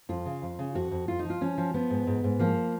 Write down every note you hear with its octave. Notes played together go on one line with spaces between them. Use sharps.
F2 F4
C#3
F2
C#3
F2 F#4
F2
F2 F4
D#4
F3
F4
F3 C#4
F3
F3 B3
G#2
G#2
G#2
F3 A#3